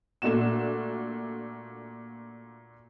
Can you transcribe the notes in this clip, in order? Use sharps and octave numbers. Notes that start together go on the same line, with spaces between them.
A#2 A3 D4 F#4 E7